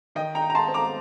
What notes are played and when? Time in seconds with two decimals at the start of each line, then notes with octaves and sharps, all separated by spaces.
0.15 D#3 D#5 G5
0.35 G5 A#5
0.41 D#4
0.50 A#5
0.55 A5 C6
0.68 C4
0.74 A#5 D6